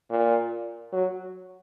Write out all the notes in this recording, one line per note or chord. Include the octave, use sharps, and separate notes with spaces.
A#2
F#3